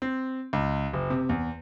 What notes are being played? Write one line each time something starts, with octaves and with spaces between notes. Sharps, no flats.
C4
C#2
F#1
C3
E2